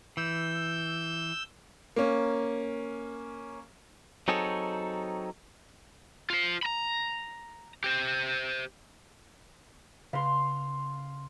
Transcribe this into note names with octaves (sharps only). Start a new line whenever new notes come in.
E3 E6 G6
A#3 C#4
F#3 C4 D#4 G#4 A4 C#5
F4 C5
A#5 B5
G4 C5
C#3 B4 F5 B5 C6